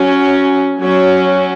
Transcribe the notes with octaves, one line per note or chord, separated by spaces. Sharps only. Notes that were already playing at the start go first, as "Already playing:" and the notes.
Already playing: F#3 C#4
F#3 C#4 C#5